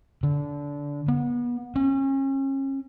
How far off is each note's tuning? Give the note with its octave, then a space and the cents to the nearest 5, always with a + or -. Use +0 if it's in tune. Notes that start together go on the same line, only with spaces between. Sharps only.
D3 -20
B3 -30
C#4 -35